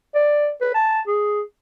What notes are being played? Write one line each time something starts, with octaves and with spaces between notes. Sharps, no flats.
D5
B4
A5
G#4